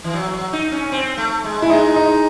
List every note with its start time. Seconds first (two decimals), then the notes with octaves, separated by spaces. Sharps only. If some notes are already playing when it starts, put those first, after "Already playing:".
0.04 E3
0.13 F#3
0.33 F#3
0.53 D#4
0.72 C#4
0.92 C4
1.17 A3
1.44 G#3
1.62 E4
1.70 G#3 D#4
1.96 D#4